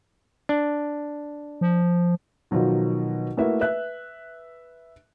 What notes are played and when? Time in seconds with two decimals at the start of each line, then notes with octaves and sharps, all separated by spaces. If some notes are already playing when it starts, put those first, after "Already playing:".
0.49 D4
1.61 F3
2.51 B2 D#3 F3 F#3 F4
3.37 A3 A#3 E4 F#4 B4 E5
3.61 B4 E5 F#6